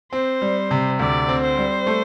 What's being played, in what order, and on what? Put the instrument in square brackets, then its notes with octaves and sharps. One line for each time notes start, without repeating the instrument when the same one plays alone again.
[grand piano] C4 [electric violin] C5
[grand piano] G3
C3
[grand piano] D2 [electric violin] D5
[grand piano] C4
[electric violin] C5
[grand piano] G3
A3